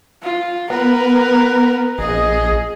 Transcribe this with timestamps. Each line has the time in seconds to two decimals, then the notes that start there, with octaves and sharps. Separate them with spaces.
0.23 F4
0.70 B3 A#4 B4
1.99 A#1 G#4 D#5